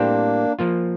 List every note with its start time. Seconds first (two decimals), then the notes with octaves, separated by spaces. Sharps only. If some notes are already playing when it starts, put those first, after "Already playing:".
Already playing: A2 G3 A#3 C4 D4 G4 C5
0.59 F3 A#3 F4